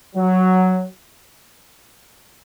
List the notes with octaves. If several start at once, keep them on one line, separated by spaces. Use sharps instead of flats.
F#3